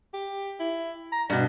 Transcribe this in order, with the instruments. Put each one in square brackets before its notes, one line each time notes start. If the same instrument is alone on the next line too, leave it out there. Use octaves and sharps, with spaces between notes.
[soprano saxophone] G4
E4
A#5
[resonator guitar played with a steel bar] G2 B2 [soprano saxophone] D5